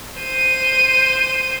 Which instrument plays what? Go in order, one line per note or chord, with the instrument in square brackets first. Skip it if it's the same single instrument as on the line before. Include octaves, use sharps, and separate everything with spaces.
[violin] C5 D#7